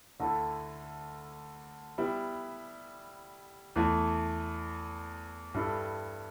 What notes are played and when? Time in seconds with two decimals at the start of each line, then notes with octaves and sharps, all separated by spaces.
0.20 D2 D3 A3 E4 A4
1.98 G3 B3 E4
3.76 E2 E3 A3
5.54 G2 G3 E4 A4